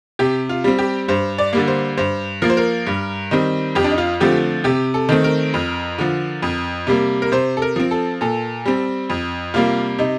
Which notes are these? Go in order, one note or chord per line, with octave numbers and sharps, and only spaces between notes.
C3 G4
F4
G3 C4
G4
G2 C5
D5
D3 G3 A#3
C5
G2 C5
F3 A#3 A#4
C5
A#4
G2
D#3 G3 C4
F2 G4
D4
D#4
F4
D3 F3 A3 C4 G4
C3 G4
A4
D#3 A3 C4
A#4
F2
D3 F3
F2
C3 G3 A#3
A#4
C3 C5
A4
A#4
F3 C4
A4
A#2 A4
G3 C4
F2
C3 G3 A#3 F4
C3 D#4